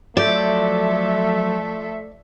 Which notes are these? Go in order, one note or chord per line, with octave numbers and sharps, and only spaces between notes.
F3 F#3 A3 A4 C#5 D5 E5 G6